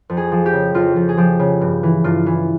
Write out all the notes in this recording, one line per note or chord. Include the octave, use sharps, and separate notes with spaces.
F2
G#4
F3
G4
C#3
F2 F4
F2
G#4
F3 G4
C#3
G2
E3
G2 F4
E3